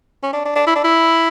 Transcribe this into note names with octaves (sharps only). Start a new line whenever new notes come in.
C#4
D4
D4
D4
E4
D4
E4